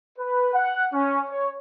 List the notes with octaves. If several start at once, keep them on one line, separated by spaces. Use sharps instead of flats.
B4
F#5
C#4
C#5